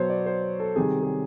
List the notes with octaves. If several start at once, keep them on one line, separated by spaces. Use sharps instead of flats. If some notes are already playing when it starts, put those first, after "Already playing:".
Already playing: B2 F#3 B3 C5 C#5
D5
C5
A4
C3 D#3 G3 G#4
G#4